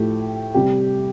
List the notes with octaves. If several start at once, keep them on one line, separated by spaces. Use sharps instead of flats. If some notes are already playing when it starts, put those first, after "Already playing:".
Already playing: A2 F3 A3 G4
C3 G3 G4